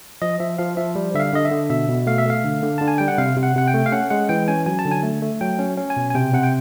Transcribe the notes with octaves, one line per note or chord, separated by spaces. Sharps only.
F3 D#5
F3 E5
F3 F5
F3 E5
G3
D3 E5
F5
D3 D#5
E5
D3
B2 E5
B2
A3 F5
E5
A3 F5
D3
D3
D3 A5
G#5
G3 G5
F#5
C3 F5
C3
F#5
C3 F#5
G5
A3
F5
C#4 F#5
G#3 F#5
E3 G5
C#4 G#5
F#3 G#5
A5
D3
G#5
A3
A3
F#3 G5
C#4
C#4
G#5
B2
G#5
C3 G5
C3 F#5
G5